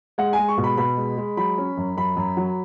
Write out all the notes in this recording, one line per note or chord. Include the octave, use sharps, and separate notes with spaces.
G#3 F#5
G#5
G#3
C#6
B2
B5
B2 B5
G#3
G#3
F#3 B5
C#4
F#2
F#2 B5
F#2
F#3